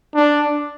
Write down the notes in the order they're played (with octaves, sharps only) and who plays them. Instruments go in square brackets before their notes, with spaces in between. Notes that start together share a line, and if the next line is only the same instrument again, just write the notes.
[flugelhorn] D4